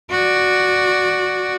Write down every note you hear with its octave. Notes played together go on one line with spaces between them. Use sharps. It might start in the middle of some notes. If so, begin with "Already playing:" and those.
F#4 D5